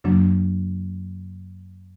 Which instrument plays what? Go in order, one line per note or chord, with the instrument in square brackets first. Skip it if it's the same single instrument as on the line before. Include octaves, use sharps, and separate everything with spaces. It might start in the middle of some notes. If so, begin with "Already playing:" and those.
[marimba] F#2 C#3 F#3 A#3 D4